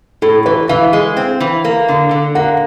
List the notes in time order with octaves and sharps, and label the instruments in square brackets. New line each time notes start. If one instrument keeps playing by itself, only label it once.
[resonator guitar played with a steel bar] A2 [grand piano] A4
[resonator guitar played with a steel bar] E3 [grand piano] B4
[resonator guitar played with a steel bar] E3 [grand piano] F5
[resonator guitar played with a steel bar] G#3
C4
E3
A#3
D3
D3
[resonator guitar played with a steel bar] A#3 [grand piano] F#5